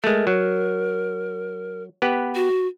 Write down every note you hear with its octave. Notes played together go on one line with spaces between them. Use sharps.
G#3 A3 A#4
F#3
B3 G4 B4
F#4